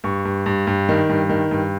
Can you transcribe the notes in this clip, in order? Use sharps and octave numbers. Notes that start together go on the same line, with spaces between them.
G2 C#6
G2
G2
G2
D#3
G2
D#3
G2